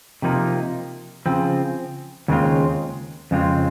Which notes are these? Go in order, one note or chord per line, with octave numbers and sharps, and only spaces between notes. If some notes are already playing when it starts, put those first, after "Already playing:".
C3 F3 A#3 D#4
C#3 F3 C4
D#2 C#3 G#3 C4 F4
F2 C#3 G#3 C4 F4